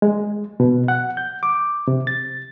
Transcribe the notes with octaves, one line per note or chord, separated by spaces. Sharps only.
G#3
B2
F#5
G6
D6
C3
A6